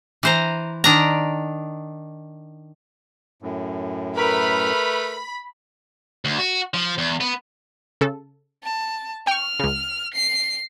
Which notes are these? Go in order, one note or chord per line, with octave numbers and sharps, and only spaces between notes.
E3 C5 A#5
D#3 D4 A#5
F#2 A2
A3 A#4 B4 B5 F6
D2
F#4
F3
E2
B3
C#3 A4
A5
G5 C#6 F6
C#2 C#3
C7